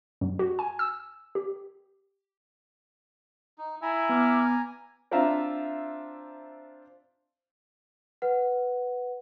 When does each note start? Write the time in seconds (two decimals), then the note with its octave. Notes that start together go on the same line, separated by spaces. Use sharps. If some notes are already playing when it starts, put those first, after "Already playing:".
0.21 F#2
0.39 F#4
0.59 G#5
0.79 E6
1.35 G4
3.58 D#4
3.82 E4 G#5 A#5
4.09 B3 D6 F6
5.11 C4 D4 F4 E5 F5 A#5
8.22 B4 F#5